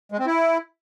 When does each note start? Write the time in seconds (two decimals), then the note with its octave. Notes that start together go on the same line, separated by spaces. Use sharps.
0.12 G#3
0.19 C4
0.26 E4